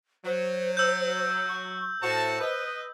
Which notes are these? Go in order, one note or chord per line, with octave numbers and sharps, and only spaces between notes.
F#3 C5
E6 G6
C#6
A2 F#4 C5 A5
B4 D#5